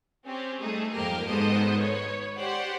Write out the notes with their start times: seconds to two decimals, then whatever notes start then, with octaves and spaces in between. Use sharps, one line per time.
0.26 C4 C#4 G4
0.61 G3 A3 D#4 G#4
0.94 F2 G#2 G3 A#3 G4 A#4
1.27 G#1 G#2 B3 A4 C5 D#5
1.77 B4 C#5
2.39 G4 C5 D5 F#5